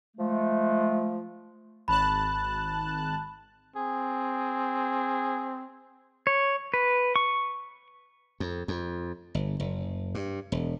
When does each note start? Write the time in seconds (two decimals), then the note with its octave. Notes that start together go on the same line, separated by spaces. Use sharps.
0.17 F3 G#3 A3
1.88 G#1 A5 B5 F#6
3.76 C4 G#4
6.27 C#5
6.74 B4
7.16 C#6
8.40 F2
8.68 F2
9.35 G1
9.60 F#1
10.15 G2
10.52 E1